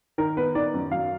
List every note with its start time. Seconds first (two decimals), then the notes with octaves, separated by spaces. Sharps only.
0.18 D#3 A#4
0.37 B3 B4
0.55 D#3 D5
0.74 F#2
0.91 F#3 F5